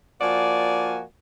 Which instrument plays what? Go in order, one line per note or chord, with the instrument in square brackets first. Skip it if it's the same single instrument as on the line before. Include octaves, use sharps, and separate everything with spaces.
[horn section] F3 A#3 F#4 D5 G#5